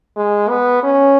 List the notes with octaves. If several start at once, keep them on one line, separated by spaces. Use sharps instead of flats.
G#3
B3
C#4